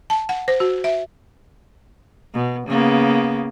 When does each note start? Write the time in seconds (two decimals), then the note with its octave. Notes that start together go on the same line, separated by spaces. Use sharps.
0.10 A5
0.29 F#5
0.48 C5
0.60 F#4
0.84 E5
2.34 B2
2.67 C#3 A#3 B3